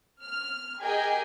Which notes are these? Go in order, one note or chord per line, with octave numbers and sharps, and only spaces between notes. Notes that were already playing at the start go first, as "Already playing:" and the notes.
F6
G4 G#4 A#4 D#5 G5 G#5